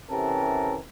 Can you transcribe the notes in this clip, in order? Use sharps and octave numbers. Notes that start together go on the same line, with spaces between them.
C3 E3 C#4 G4 A4 A#4